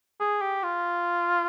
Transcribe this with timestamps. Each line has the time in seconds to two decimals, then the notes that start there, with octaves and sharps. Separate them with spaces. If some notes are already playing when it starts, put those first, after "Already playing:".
0.20 G#4
0.41 G4
0.63 F4